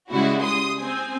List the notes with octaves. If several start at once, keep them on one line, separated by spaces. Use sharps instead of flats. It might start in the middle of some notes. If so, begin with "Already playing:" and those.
C#3 G3 G#3 E4 F#4
C6 D#6
C4 G#5